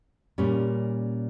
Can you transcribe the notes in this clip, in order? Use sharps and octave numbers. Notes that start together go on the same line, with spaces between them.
A#2 G3 C#4